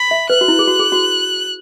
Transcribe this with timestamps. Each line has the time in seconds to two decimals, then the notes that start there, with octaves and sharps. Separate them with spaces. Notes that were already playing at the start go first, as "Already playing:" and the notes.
Already playing: B5
0.11 E5
0.30 B4 F#6
0.41 F#4
0.48 E4
0.59 G#4
0.67 F#4
0.79 G#4
0.92 F#4